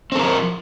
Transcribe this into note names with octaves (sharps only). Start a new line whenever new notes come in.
F3 C4 A4 A#4